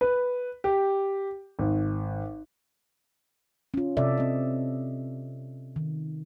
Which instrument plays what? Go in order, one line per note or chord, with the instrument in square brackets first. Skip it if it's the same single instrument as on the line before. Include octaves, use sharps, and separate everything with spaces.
[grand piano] B4
G4
G#1
[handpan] C#4 F4
C3 A4 D5 E5
C4 D#5
D#3